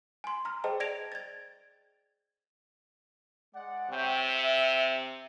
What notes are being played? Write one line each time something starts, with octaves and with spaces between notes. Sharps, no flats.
G#5 C6
A#5 C6 F6
G#4 C5 D#5 G5 A5
D5 G#6 A#6 D7 F7
G#6 A6
G#3 D5 F#5
C3 C#5 E5 G5
E5